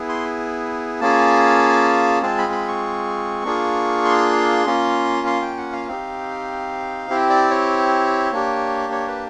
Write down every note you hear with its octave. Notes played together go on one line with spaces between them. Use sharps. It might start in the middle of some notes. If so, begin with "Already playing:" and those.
Already playing: B3 E4 G#4
C6
A#3 C#4 F4 G#4 A5
G#3 C4 F4 G#4 A5
B5
B5
C#6
A#3 D4 F4 G#4
C6
A#3 C#4 F4
C6
G5
F#5
F5
C4 D#4 G4 F5
C4 E4 G4
D5
C#5
A#3 D4 G4
C#5
B4